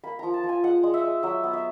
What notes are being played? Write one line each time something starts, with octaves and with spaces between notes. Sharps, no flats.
A#3 B5
F3 A#5
A5
F3
G#5
G#3 F#5
G#3
E5
G#3
F#3 E5
B3
E5